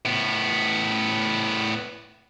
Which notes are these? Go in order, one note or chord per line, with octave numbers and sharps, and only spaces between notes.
A2 B3